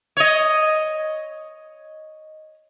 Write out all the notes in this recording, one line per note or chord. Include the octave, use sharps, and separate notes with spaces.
C#5 D#5